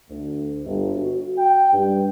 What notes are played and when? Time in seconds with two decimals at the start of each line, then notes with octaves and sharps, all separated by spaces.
0.11 D2
0.66 G1
0.96 F#4
1.38 G5
1.73 G2